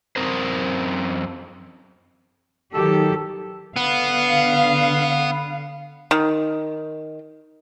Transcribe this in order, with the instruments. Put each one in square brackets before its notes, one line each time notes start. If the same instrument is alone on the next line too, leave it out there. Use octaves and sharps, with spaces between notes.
[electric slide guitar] F#2 C4 A#4 C5
[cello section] D#3 F#3 G4 [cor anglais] A4
[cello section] D3 F5 [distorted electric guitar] B3
[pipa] D#3